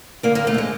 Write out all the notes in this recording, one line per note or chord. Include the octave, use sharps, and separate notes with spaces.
D3 A#3
F2 A#3
A3
D3 G#3